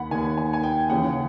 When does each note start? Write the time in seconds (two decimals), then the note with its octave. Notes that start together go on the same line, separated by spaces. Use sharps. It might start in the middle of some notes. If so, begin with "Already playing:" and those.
Already playing: D#2 D#3 F#5 B5
0.11 D#2 D#3 G#5
0.37 G#5
0.53 G#5
0.63 G5
0.90 D#2 C#3 E3 F#5